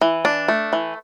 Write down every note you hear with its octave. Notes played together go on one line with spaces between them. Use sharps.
E3
D4
A3
E3